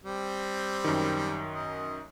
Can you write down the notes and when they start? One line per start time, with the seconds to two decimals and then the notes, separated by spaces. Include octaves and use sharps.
0.04 G3 C4
0.84 F#2 D#3
1.54 D#5